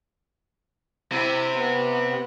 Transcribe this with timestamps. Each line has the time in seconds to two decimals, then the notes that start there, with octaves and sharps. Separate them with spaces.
1.12 C3 E4
1.57 B3